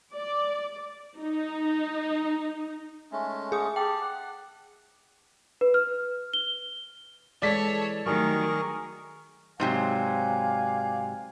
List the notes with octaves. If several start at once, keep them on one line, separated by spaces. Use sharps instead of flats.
D5
D#4
G#3 A3 C#4
G#4 D#6
G4 G5 A5
F#5
B4
F6
G7
E3 G#3 A4 C#5 D5 B6
D#3 F#3 G3 A3 G#4 A#4 C#6
G#2 C3 F#3 D5 F5 G#5